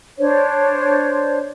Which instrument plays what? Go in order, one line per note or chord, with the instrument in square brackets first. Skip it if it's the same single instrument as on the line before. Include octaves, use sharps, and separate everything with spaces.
[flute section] D4 C5 C#5